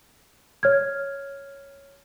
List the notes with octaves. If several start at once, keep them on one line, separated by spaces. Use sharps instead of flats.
C#5 F6 G#6